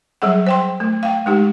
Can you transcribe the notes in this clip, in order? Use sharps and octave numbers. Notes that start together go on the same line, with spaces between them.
F#3 G3 G#4 F#5
C5 G5 C6
A3
F5 G5
G#3 D#4 G4